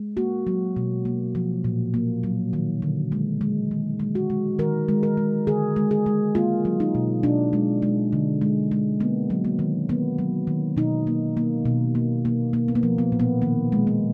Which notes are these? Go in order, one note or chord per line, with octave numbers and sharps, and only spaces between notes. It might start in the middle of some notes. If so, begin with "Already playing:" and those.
Already playing: G#3
A#3 F#4
F#3
B2
A#3
F3
A#2
A#3
F#3
D#3
D3
G#3
G#3
D#3
G#3
F#4
G#3
D#3 A#4
G#3
A#4
G#3
D3 G#4
G#3
G#4
G#3
A#3 F4
F#3
D#4
B2
B2 D4
G#3
G#3
D3
G#3
G#3
A#3 B3
F#3
A#3
D#3
A#3 B3
F#3
D#3
B2 D#4
A#3
A#3
B2
A#3
A#3
A#3
B3
A#3
F3
B3
A#2
B3
D#3 A#3
G#3
B3